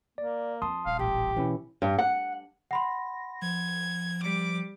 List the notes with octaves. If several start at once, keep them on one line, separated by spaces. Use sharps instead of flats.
A#3 D5
F2 A5 C6 D#6
D#1 F5
A1 G4
B2 D3 E3 C#4 E4
G2
F#5
F#5 B5 C6 A#6
F3 G#6
G3 D6